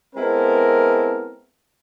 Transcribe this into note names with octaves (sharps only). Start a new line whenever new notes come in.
G#3 B3 C4 E4 A4 A#4